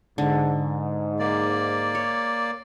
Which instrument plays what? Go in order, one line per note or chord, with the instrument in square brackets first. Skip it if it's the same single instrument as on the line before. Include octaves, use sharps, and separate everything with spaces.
[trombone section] G#2 [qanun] D3
[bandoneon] A#3 D5
[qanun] C#5